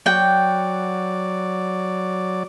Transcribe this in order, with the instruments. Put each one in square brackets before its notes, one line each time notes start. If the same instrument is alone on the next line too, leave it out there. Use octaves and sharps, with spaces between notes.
[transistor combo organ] F#3 D5 [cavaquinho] F#4 G5